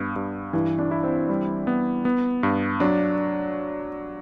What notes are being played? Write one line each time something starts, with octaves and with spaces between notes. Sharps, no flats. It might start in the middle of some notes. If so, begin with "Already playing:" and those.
Already playing: G2 B3
G2
G2 E3
D4
E4
C4
G3
B3
B3
G2
F#3 D4